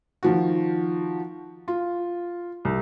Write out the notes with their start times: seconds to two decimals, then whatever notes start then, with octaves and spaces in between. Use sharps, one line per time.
0.23 D#3 F3 F#4
1.68 F4
2.65 C2